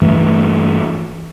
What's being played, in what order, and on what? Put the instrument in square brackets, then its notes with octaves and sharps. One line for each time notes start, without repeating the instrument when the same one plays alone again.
[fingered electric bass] G2 E3 A3